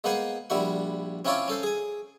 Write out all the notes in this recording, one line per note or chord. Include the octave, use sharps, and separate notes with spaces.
G#3 A#3 B3 C5 F#5 G#5
A#1 G3 E4 F#4 F#5
C4 C#4 E4 F4 C#5 D5
C#4 A4 C5
G#4 G#5